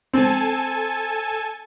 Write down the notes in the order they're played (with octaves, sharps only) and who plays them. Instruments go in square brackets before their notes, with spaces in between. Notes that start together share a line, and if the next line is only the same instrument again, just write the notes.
[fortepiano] C4 [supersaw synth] A4 G#5 A5